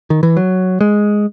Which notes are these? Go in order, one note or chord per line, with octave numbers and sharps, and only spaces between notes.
D#3
E3
F#3
G#3